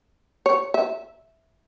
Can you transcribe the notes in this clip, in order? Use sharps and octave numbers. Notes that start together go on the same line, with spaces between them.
C#5
E5